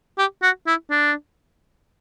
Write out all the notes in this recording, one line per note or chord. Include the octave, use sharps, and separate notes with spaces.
G4
F#4
E4
D4